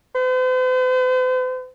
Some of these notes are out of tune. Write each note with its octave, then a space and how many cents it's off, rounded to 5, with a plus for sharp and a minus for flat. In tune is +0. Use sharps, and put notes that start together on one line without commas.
C5 -45